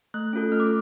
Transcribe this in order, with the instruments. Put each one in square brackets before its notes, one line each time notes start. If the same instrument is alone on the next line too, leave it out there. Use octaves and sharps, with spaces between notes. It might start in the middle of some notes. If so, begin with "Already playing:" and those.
[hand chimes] A3 F#6
C#4 F4 A4
A3 F6
D6